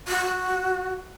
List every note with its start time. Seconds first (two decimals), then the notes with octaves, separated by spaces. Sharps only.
0.08 F#4